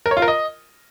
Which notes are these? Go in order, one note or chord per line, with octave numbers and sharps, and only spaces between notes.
A#4
C#5
F4
A#4
D#5